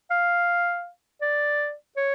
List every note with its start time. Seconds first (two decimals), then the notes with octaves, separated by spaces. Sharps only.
0.11 F5
1.21 D5
1.97 C#5